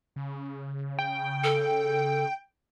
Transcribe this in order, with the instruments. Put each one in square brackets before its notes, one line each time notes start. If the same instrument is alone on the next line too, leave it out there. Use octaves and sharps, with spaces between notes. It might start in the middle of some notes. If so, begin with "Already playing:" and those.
[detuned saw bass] C#3
[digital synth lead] G5
[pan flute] A4